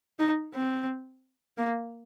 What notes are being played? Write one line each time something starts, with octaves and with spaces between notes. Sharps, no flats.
D#4
C4
A#3